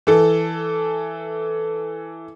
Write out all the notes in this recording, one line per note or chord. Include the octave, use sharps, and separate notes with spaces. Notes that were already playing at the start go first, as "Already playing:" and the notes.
E3 A4